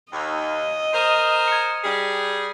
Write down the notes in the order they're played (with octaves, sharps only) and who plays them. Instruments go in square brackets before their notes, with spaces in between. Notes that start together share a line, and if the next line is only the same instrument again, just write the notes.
[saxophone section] D#2 [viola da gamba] D#5
[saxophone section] A#4 C5 [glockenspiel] D#6 D#7
[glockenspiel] G#6 C#7
[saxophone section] G3 G#4